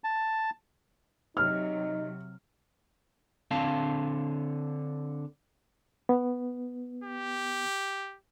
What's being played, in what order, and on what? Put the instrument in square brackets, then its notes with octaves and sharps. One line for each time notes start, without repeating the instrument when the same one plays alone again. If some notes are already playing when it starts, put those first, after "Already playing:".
[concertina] A5
[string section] C3 F#3 [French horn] D#4 [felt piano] F6
[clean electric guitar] D3 C4 F5 A5
[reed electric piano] B3
[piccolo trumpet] G4